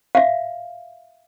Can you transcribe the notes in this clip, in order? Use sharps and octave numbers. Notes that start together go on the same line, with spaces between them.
E5 F5